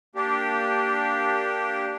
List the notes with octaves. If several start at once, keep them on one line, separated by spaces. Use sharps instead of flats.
A#3 D4 G4